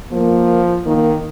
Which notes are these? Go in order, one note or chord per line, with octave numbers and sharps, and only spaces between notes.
F3 A#3
D#3 A#3